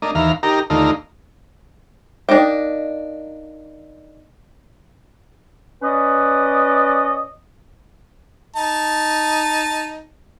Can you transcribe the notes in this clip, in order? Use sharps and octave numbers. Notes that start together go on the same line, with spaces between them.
A#3 D4 D#5
D#2 E3 F5 A#5
D#4 G4 A#4 A#5
D#2 D3 A3 D#4 F4 A#5
A#3 D4 D#4 D#5 G5
C#4 B4 D5 D#5
D#4 A5